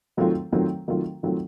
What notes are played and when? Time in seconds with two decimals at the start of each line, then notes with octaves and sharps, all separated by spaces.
0.17 D#3 F#3 A3 C4 F4
0.52 D#3 F#3 A3 C4 F4
0.88 D#3 F#3 A3 C4 F4
1.23 D#3 F#3 A3 C4 F4